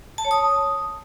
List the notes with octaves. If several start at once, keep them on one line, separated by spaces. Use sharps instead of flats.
A5
C#5
D#6